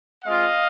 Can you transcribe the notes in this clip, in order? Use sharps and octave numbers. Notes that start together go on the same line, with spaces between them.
G#3 C4 F4 D#5 F5